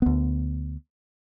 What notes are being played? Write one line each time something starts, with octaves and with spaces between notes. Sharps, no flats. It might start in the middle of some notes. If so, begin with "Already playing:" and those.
D2 B3